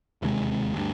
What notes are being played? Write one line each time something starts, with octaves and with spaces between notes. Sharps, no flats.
E1 D#2 C3 G#3
D2 G2